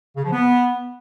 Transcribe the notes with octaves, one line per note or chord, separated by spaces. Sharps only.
C#3
F3
B3